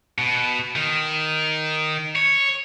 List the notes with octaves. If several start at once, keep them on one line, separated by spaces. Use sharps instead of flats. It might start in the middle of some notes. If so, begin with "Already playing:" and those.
B2
D#3
C#5